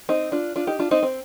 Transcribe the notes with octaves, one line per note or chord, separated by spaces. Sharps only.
C4 D#4
D4 F4
D4 F4
D#4 G4
D4 F4
C4 D#4
C4